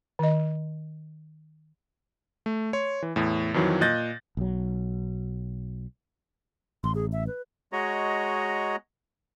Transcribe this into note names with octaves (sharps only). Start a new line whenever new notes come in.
D#3 D#5
A3
C#5 C6
E3
E2 A2
F2 D#3 E3 F#3
A#2 D#5 F#6 G6 A6 A#6
B1 F#3
A1 C6
G#4
E5
B4
G#3 F#4 C#5 D#5 A#5